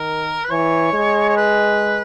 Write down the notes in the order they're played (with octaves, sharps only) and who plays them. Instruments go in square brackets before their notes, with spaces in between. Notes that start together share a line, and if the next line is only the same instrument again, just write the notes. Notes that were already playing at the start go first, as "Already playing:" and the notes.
Already playing: [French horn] D#3 [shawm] A#4
[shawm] B4
[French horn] E3 [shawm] C#5
[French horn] G#3
[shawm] C#5
B4